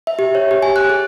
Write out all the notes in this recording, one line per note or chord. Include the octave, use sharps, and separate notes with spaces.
E5
G4
C#5
G4
G#5
F#6
G#4